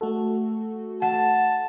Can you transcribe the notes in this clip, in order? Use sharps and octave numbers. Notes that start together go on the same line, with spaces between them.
A3 F#4 A4
F#5 A5